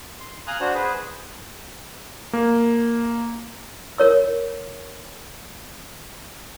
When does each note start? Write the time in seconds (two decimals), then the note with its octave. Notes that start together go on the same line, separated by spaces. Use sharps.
0.20 C6
0.47 F5 G#5 A#5 D#6 F6 F#6
0.61 D4 F#4 C5
0.74 G#4 B4 C5
2.33 A#3
3.98 A#4 C#5 E6